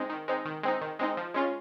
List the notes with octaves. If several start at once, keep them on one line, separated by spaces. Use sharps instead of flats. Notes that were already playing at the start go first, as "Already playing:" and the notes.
Already playing: G#3 C4 D#4
D#3
G#3 C4 D#4
D#3
G#3 C4 D#4
D#3
G#3 C4 D#4
F3
G#3 C#4 F4